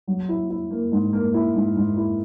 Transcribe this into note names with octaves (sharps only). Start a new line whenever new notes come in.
F#3
E4
E4
A#3
G#2
A#3
E4
G#2
G#2
E4